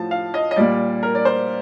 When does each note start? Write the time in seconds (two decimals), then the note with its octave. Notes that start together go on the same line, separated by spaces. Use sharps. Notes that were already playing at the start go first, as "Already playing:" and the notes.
Already playing: A2 F3 A5
0.11 F5
0.34 D#5
0.51 D#5
0.56 A#2 G3 D5
1.03 A#4
1.15 D5
1.25 C5